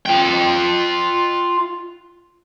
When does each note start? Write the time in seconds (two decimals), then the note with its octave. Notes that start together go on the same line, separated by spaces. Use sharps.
0.06 F4 G5